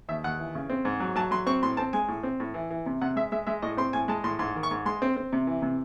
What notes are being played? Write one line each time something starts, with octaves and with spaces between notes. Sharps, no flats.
D#2 E5
D#2 F#5
E3
C#3
C4
G#2
F#3
F#3 A5
F#3 C6
C4 C#6
A2 C6
C4 A5
G#3 G#5
A2
C4
A2
E3
E3
C3
C3 F#5
G#3 E5
G#3 E5
G#3 E5
A2 D#5
C4 C6
A2 G#5
G#3 A5
A2 C6
G#2 C6
D#3
C#6
G#2
G#3 C6
C4
C4
C3
E3
C3